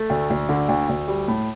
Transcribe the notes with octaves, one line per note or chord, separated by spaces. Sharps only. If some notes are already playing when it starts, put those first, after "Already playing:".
Already playing: A3
D2
D2
D3
D2
D2
G3
A2